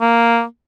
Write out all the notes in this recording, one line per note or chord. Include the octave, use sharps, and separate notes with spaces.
A#3